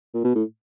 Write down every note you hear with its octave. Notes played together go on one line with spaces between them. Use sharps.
A#2
B2
A2